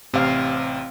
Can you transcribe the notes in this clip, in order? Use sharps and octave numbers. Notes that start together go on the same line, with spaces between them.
A1 C3 C4 F5